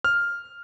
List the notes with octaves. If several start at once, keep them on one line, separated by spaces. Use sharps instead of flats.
F6